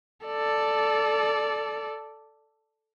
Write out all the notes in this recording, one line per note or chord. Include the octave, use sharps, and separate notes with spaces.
A4 D5